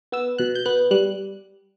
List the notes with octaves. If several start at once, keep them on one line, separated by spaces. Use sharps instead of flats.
B3 E6
B2 F#6
G6
B3 F#6
G3 F#6